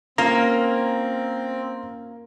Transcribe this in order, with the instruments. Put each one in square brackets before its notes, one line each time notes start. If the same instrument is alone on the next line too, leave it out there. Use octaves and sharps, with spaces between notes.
[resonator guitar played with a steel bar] A#3 [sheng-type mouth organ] C4 [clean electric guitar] C#4 F4 [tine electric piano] A#5